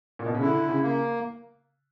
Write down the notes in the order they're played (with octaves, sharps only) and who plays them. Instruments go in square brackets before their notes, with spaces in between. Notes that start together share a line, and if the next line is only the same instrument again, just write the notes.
[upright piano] A#2
B2
C#3
[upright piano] D3 [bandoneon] E4
[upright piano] C#3
[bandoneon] A#3